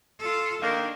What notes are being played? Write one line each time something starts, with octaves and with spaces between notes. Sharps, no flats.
F4 A4
D#3 A#3 D4